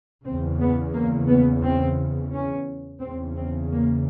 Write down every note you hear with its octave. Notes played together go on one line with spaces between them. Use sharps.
E2 C#3 C4
B3
A#3
B3
C4
C#4
E2 C#3 C4
C4
A#3